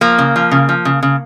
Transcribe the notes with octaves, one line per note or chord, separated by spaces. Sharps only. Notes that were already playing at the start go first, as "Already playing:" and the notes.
F3 A#3
C#3
F3
C#3
F3
C#3
C#3